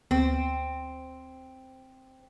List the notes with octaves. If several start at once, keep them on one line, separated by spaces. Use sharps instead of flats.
D2 B3 C4